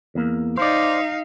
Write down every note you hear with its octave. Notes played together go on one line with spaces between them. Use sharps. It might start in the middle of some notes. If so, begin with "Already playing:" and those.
E2 A#3
D#4 C5 D5 F5